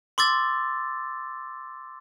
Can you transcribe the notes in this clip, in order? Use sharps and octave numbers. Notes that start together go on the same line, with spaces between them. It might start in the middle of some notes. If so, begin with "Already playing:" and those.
C6 D6 E6 A6